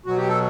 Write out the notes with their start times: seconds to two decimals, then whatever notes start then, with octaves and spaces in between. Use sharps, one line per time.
0.06 B2 F#3 F#4
0.17 G4
0.28 A4